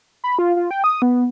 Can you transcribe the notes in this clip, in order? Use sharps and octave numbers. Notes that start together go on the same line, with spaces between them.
B5
F4
F4
G5
D#6
B3